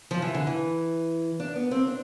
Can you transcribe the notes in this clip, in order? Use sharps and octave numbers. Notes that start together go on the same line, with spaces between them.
F3
E3
D3
E3
D4
B3
C4
D4